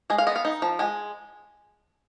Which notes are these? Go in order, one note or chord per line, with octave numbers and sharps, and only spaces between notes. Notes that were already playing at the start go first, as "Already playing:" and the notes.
G#3 G#4
F5
B3 D#5
F5
D#4
F3
G#3 G#5